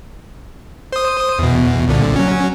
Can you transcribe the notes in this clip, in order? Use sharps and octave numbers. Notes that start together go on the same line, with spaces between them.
C5 D#6
E2 B2
C2 A#2 D3
F#3 C#4